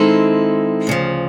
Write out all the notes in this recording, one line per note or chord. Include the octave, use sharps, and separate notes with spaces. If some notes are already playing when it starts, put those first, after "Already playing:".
Already playing: D#3 G#3 C4 E4 A4
D2 C#3 F3